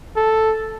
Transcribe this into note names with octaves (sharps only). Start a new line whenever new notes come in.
A4